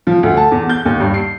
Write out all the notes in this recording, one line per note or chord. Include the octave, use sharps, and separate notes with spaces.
F3
D2
A5
E2
G6
D#2
G2
C7